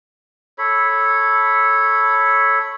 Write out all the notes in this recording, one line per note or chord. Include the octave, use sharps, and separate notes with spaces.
A4 C#5 B5